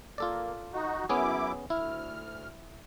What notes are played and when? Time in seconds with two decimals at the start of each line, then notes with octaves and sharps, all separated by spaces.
0.18 A#3 F4 A4 D5
0.73 D#4 F#4
1.09 F#2 B3 C#4 E4 G#4 D6
1.70 D2 E4 F6